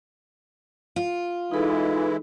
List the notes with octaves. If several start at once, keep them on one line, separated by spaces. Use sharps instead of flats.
F4
E3 G#3 D#4 E4 A4